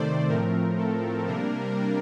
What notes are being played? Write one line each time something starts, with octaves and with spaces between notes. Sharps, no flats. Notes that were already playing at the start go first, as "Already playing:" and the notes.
Already playing: C3 D#3 A3 C5 D5
A2 F3 A3 C4 A#4
A4
C3 G3 A#3 D4 A#4